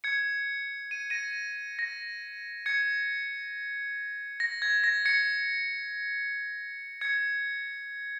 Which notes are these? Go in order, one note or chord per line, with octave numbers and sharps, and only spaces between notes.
G#6 C#7
D#7
A#6 D#7
A#6
G#6 C#7
A#6
G#6
A#6
G#6 C#7
G#6 C#7